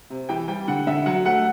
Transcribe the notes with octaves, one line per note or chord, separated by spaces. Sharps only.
C3
E3 G5
G3 G5
D3 F#5
D3 E5
F#3 F#5
A3 F#5